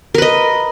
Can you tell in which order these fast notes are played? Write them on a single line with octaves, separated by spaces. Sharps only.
A#4 B4 D#5